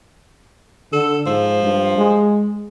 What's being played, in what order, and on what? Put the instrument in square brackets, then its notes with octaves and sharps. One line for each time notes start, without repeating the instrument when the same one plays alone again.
[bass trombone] D3 [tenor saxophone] A4
[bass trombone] G#2 [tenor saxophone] F3
[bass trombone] G2
G#3